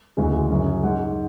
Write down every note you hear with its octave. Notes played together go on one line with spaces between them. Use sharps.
D2 C#3 E3 G#3 F#4
F#2 C#3 F#3
G#4
G#2 G#3 F#5